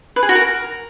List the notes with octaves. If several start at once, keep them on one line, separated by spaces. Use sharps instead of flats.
B4
G#4
F#4
A#4